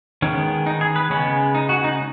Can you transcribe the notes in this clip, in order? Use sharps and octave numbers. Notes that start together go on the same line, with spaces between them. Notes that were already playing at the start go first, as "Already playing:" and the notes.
D#3 G#3 B3 C#4
D#4
G#4
B4
C#3 G#3 B3 C#4
D#4
F#4
D#4